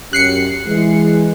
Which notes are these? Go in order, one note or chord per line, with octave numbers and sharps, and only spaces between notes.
F#2 C#4 G4 F#6 C7 C#7
E3 G#3